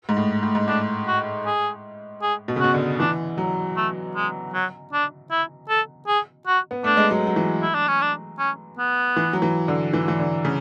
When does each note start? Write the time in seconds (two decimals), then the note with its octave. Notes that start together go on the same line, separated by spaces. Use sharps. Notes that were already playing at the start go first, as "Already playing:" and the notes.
0.09 G#2
0.17 A2
0.43 A2
0.55 G#2
0.67 A2 D4
1.07 F#4
1.46 G#4
2.22 G#4
2.48 B2
2.56 C#3
2.60 B2 F#4
2.74 D3
2.99 E3 D4
3.38 F#3
3.76 A3
4.16 G#3
4.54 F#3
4.93 D4
5.31 E4
5.69 A4
6.08 G#4
6.47 F#4
6.71 B3
6.84 A3 D4
6.97 G#3
7.11 F#3
7.27 F#3
7.36 E3
7.62 E4
7.75 D4
7.88 C#4
8.01 D4
8.39 C#4
8.78 B3
9.16 E3
9.33 F#3
9.42 E3
9.68 D3
9.93 E3
10.08 E3
10.19 D3
10.45 C#3